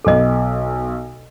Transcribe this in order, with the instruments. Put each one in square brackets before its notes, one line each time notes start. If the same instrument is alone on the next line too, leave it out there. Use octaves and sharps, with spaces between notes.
[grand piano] B1 D6 [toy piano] A4 D#5